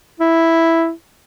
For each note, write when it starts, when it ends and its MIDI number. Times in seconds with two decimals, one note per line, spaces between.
0.20 0.91 64